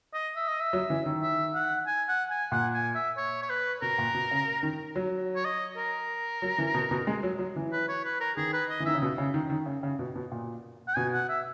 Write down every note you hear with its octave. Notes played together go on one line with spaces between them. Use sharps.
D#5
E5
D#5
E5
F#3
E3
D#3
E5
F#5
G#5
F#5
G#5
A#2 F#5
G#5
E5
C#5
C#5
B4
B2 A#4
A#2
B2
C#3
D#3
F#3
C#5
D#5
A#4
F#3
E3
B2
B2
G#3
F#3
F#3
E3
B4
C#5
B4
A#4
D#3 G#4
B4
D#5
E3
D#3 E5
C#3
B2
C#3
D#3
D#3
C#3
C#3
B2
B2
A#2
F#5
B2 G#5
F#5
E5